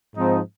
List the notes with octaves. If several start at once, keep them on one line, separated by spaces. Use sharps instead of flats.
G#2 F3 C4 D#4